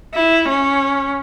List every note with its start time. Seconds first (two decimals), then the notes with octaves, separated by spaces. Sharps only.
0.14 E4
0.49 C#4